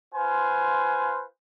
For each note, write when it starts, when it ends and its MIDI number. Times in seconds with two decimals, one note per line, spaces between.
0.14 1.24 65
0.14 1.24 71
0.14 1.24 72
0.14 1.24 80